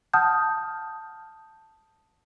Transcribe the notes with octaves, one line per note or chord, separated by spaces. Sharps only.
F#5 A5 D#6 F6 G6